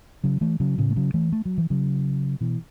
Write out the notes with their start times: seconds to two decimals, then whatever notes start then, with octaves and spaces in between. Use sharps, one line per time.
0.24 C#3 F#3
0.41 E3 A3
0.60 C#3 F#3
0.78 A2 C#3
0.91 A3
0.96 C#3 F#3
1.14 E3 A3
1.32 A3
1.45 F#3
1.58 E3
1.70 C#3 F#3
2.41 B2 E3